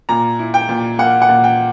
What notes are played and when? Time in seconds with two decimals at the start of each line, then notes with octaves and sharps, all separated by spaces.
0.09 A#2 A#5
0.39 E4
0.54 G5
0.69 A#2
0.99 A#3 F#5
1.22 F#5
1.29 A#2
1.44 G5